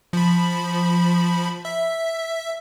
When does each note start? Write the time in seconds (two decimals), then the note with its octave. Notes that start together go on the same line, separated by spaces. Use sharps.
0.13 F3 B5
1.65 E5